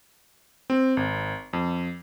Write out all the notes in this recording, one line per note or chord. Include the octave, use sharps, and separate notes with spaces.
C4
G#1
F2